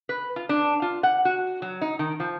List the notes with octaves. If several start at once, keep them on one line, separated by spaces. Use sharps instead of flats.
B4
F4
D4
F4
F#5
F#4
F#3
D#4
D#3
F3